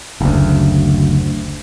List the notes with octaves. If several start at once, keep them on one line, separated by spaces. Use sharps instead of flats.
F#1 D2